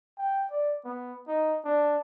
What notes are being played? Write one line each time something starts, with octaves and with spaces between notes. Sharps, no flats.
G5
D5
B3
D#4
D4